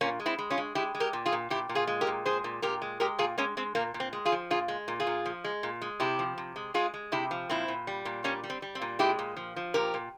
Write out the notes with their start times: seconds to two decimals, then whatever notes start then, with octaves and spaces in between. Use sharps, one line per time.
0.01 A#2 A#3 C#4
0.20 G#3
0.26 C4 E4
0.39 G#3
0.50 C#4 F4
0.58 G#3
0.75 G#3 E4 G4
0.95 G#3
1.00 G4 A#4
1.13 A#2
1.26 F4 G#4
1.32 A#2
1.50 A#2 E4 G4
1.69 A#2
1.75 F4 G#4
1.87 G#3
2.01 G4 A#4
2.07 A#2
2.26 G#3 G#4 C5
2.44 A#2
2.62 A#2 G4 A#4
2.82 G#3
3.00 G#3 G4 A#4
3.19 A#2 F4 G#4
3.38 G#3 A#3 C#4
3.57 G#3 C4
3.75 A#2 A#3
3.94 A#2
4.00 C4
4.13 G#3
4.25 F4 G#4
4.32 F3
4.51 A#2 F4 G#4
4.68 G#3
4.88 A#2
5.00 F4 G#4
5.07 A#2
5.26 F3
5.44 G#3
5.63 A#2
5.82 G#3
6.00 C3 E4 G4
6.19 F3
6.38 C3
6.56 G#3
6.74 G#3 F4 G#4
6.94 G#3
7.12 C3 E4 G4
7.31 F3
7.50 A#2 C4 E4
7.68 A#2
7.87 G3
8.05 A#2
8.24 G3 A#3 C#4
8.43 G3
8.50 C4
8.62 G3
8.75 C4
8.82 A#2
8.99 G#3 E4 G4
9.19 A#2
9.37 F3
9.56 F3
9.74 A#2 G4 A#4
9.94 A#2